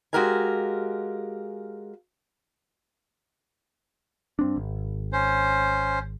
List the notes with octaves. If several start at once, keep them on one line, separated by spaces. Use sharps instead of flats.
G#3 F#4 G4 A#4 F5 G#5
G2 C4 D4
G#1
C#4 C5